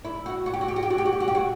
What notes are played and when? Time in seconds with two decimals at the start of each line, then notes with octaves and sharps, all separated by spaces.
0.05 E4
0.26 F#4
0.46 F#4
0.54 G4
0.61 F#4
0.68 G4
0.76 F#4
0.83 G4
0.90 F#4
0.98 G4
1.05 F#4
1.13 G4
1.20 F#4
1.28 G4
1.35 F#4